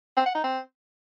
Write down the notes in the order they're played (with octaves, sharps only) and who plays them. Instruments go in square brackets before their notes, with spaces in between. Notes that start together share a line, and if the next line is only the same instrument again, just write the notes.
[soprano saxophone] C4
F#5
D#4
C4